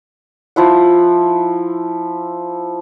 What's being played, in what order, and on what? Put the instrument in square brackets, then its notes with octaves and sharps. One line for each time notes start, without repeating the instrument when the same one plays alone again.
[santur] F3 E4 F#5